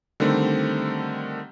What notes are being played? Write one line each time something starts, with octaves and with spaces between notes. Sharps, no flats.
D3 D#3 G3 A3 C4